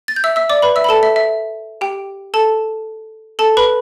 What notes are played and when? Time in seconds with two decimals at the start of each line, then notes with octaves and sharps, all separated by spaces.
0.08 A6
0.16 G6
0.24 E5 E6
0.36 E5 E6
0.50 D5 D6
0.62 B4 B5
0.76 E5 E6
0.84 B5
0.89 A4 A5
1.03 E5
1.16 E5
1.81 G4 G5
2.34 A4 A5
3.39 A4 A5
3.57 B4 B5